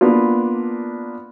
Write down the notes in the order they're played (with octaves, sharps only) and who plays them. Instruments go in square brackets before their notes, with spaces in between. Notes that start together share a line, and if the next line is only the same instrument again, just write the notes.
[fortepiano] A#3 B3 D4 F4